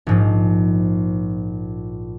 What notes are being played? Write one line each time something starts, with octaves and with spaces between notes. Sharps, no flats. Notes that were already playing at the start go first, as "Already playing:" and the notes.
A#1 G#2 F3